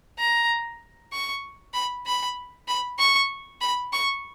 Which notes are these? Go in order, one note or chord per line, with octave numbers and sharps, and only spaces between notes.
A#5
C#6
B5
B5
B5
C#6
B5
C#6